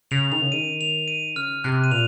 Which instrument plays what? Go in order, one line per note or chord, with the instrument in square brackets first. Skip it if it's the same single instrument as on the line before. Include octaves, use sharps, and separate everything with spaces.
[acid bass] C#3 [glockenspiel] F7
[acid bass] D#3 [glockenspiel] F7
[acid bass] C#3
[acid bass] D#3 [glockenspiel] D#7
[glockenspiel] F7
D#7
[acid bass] C#3 [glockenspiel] F6
[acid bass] C3 [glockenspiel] F#6
[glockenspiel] D#7
[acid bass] A#2 [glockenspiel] F7